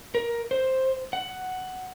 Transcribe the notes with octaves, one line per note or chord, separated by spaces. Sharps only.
A#4
C5
F#5